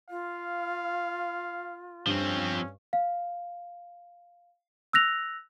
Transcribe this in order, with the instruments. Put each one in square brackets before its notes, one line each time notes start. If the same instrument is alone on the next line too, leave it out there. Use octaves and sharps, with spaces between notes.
[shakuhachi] F4 [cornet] F5
[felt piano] G2 [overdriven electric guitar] F3 C4 [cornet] C#4
[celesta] F5
E6 F#6 A#6 F7